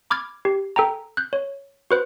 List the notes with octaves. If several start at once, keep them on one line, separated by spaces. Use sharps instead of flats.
B5 D6 F6 G#6 A6
G4
A4 G5 G#5 A#5
F#6 G6
C#5
F#4 B4 C5